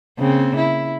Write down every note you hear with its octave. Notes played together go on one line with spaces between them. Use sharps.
C#3 A#3 C4
E4